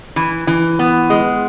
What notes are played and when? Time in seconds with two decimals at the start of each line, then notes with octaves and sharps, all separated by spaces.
0.16 E3
0.47 E3
0.79 B3
1.10 G#3